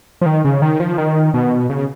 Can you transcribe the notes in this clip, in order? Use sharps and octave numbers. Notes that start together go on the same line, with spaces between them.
F3
D#3
C#3
D#3
F3
D#3
B2
C#3